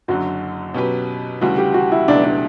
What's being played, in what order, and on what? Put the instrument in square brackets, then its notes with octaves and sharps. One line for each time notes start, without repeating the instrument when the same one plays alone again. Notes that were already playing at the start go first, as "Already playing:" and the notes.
[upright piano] F#1 F#2 D3 F#3 [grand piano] F#4
[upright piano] B2 F#3 C#4 G4 B4
[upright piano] D2 C#3 E3 G3 [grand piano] F#4
[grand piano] G4
F#4
E4
[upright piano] C#2 B2 F#3 A3 [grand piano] D4
[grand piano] D4